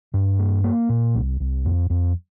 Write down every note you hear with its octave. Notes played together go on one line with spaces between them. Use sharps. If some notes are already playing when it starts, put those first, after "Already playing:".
G2
A#3
A#3
A#2
C2
C2
F2
F2